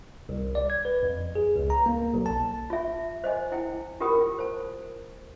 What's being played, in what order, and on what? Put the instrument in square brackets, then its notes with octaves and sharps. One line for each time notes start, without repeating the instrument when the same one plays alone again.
[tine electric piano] C2
D5
G#6
B4
F2
G#4
C#2
A#5
A#3
B1
A5
[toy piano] F4 E5
C5 D#5 G#5
E4 G5
F4 G4 A#4 G5 B5 D#6
C5 A5